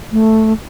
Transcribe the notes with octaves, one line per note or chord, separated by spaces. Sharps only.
A3